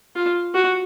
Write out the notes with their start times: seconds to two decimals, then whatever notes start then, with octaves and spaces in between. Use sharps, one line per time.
0.16 F4
0.55 F#4